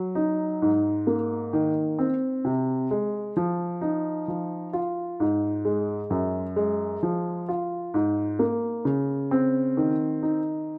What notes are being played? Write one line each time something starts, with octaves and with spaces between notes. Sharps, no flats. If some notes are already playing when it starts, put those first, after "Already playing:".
Already playing: F#3
D#4
G#2
A#3
D#3
C4
C3
G#3
F3
D#4
F3
F4
G#2
G#3
F#2
G#3
F3
F4
G#2
A#3
C#3
C4
D#3
D#4